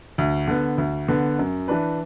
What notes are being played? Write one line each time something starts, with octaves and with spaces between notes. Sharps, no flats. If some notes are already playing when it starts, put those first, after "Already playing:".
D2
D3 B3
D2
D3 B3
F#2
E3 D4 B4